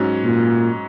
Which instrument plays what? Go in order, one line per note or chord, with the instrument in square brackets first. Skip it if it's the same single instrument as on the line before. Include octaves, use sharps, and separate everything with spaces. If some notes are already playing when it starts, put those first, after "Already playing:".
Already playing: [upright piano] G#2 F#3 C#4
[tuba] A#2